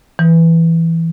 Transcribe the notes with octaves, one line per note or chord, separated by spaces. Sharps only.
E3